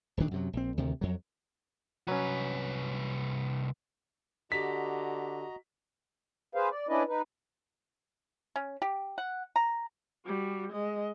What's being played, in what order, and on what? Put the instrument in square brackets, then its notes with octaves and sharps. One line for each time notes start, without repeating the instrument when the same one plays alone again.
[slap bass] D#1 D2 D#3 D4
F#2 C3 F#3
A#1 C4
D2 C3 D#3
F2 F#3
[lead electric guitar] C2 B4 [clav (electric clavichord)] F#3 C#4
[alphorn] D3 [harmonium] F#4 D#5 A#5 [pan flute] G4 [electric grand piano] B6
[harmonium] G#4 B4 C5 F5
D5
C#4 D4 E4 B4 D5 D#5
D#4 B4
[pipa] C#4
G4
F#5
A#5
[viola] G3 F#4
G#3 D#5